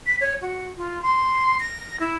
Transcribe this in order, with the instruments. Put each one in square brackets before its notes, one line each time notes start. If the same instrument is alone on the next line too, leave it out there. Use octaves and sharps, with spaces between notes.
[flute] B6
C#5
F#4
F4
C6
A#6
E4